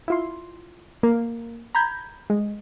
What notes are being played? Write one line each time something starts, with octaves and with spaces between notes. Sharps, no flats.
E4 F4 C6
A#3
A#5 B5 G6 G#6
G#3